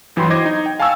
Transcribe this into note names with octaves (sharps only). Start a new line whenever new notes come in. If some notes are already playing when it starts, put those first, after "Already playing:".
G1 E3 F#3 G5 B5 C6
C5 D#5 D6 G#6 A#6
D#4
G5
F5 G#5 A5 C#6 E6